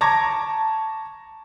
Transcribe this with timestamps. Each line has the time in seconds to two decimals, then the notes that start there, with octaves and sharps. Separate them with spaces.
0.01 A5 A#5 C#6 D6 G#6 A#6